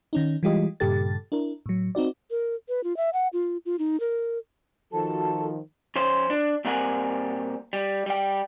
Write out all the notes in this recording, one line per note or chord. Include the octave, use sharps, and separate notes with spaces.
D#3 C#4 D#4
E3 G3 G#3 F4 G4 D#5
G2 A#2 C#3 G4 A4 A6
D4 E4 A#4
A2 F#3
C4 D#4 F#4 D5
A#4
B4
F4
E5
F#5
F4
F4
D#4
A#4
D#3 F3 F#4 A4 A5
F3 C#4 C5
D4
A#2 G3 C4 A#4 F#5 G#5
G3
G3 G5